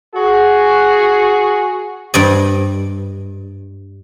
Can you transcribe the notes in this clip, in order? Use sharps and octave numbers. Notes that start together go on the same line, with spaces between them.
F#4 G#4
G2 D5 D#5